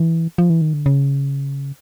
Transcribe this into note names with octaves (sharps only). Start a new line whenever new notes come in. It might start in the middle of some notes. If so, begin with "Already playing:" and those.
Already playing: E3
F3
E3
D#3
D3
C#3